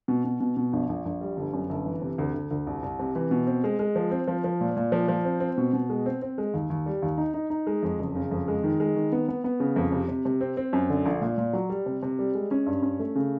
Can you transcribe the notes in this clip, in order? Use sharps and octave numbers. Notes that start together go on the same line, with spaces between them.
B2
B2
B2
B2
A#1
A#1
A#1
G3
G1
F#2
G1
E3
C3
D2
D2
D2
C2
C2
C3
E3
B2
C4
G#3
G#3
F3
C4
F3
F3
A#2
A#2
F3
F3
C4
C4
B2
B2
G#3
C4
C4
G#3
D#2
D#2
G3
D#2
D#4
D#4
D#4
G#3
F2
F#1
C#3
F2
G#3
D#3
G#3
D#3
B3
B3
B3
C#3
F2
C3
C3
C3
C4
C4
F#2
D3
A#1
A#2
A#2
F#3
G3
C3
C3
G3
G#3
C#4
G2
C#4
A3
C#3